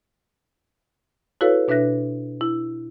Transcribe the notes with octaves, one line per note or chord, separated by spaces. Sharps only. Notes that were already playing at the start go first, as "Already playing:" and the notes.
E4 F#4 A4 B4 C#5 F5
B2 D4 B4 E5 F#6 A#6
E4